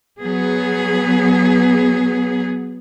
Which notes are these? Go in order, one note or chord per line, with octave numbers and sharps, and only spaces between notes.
F#3 B3 G#4